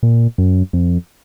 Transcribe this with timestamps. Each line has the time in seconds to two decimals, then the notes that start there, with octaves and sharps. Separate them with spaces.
0.03 A#2
0.38 F#2
0.73 F2